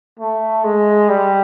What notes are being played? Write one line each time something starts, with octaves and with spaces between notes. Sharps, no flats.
A3
G#3
G3